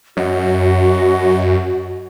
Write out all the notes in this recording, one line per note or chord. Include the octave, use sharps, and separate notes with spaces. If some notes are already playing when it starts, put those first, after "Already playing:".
F#2 F#4 C#5 D#5 F#5